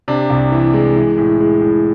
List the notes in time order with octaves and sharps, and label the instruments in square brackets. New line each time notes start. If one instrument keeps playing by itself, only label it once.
[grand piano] C3 D4
C2
E3
G#3
E3
A2
G#3
A2